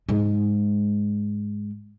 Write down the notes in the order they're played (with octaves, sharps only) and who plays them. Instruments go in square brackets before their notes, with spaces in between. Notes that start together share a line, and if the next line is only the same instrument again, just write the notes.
[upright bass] G#2 G#3